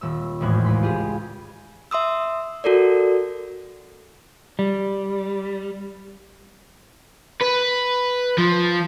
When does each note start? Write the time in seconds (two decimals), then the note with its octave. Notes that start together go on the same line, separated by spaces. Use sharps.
0.01 D#1 E6
0.41 G#1 E2 A2 F#6 G#6
0.65 C#2 G#3 B5 C6
0.83 F4 G4 G#4
1.91 E5 C6 D#6 E6
2.64 F#4 A4 A#4 D5
4.59 G3
7.42 B4
8.38 F3